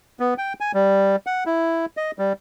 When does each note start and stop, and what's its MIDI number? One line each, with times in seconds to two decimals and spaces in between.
0.20 0.34 59
0.38 0.53 79
0.60 0.72 80
0.74 1.16 55
1.26 1.44 78
1.46 1.86 64
1.97 2.11 75
2.19 2.33 55